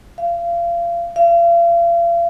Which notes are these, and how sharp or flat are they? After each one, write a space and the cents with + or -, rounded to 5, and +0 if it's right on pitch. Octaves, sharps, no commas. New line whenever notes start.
F5 -30
F5 -40